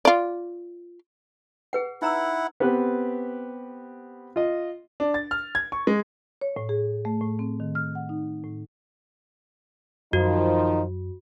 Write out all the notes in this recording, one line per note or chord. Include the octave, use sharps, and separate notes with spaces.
F4 D5
G#4 B4 F#5
D#4 E4 F#5 A#5 E6
B3 C4 G4 B4
F4 D#5
D4
A6
F6
G#6
C#6
G#3
C#5
A2
G#4
A3
A2
C4
D#3
F6
F#5
D#4
A2
F#2 D#3 F3 D#4 F#4